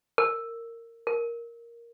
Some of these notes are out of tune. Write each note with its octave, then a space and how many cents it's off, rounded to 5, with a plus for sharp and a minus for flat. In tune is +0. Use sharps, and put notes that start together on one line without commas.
A#4 -15
A#4 +5